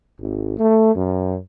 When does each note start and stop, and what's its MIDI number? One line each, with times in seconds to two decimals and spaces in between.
0.19 0.57 32
0.58 0.91 57
0.95 1.35 42